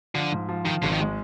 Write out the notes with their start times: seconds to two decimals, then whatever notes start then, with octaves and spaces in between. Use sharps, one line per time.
0.15 D3 F3
0.32 G#2
0.49 F3
0.65 D#3 F3
0.82 G#1 D3
0.92 D#3
1.00 G#3